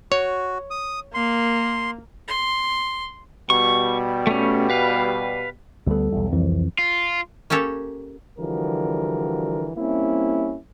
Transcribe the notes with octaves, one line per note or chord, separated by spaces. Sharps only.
F#4 C#5
D#6
A#3 C6
C6
B2 G3 C#6
A3 C#4
B4 F5
D2 G3 B3 A4
B1 E2
C2 F2 E3
F4
A#3 C#4 G4 A4 C#5
D3 E3 F3 G3 F#4 A#4
G3 A#3 C4 C#4 E4